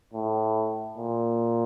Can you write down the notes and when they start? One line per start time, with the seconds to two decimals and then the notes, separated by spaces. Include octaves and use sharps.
0.14 A2
0.98 A#2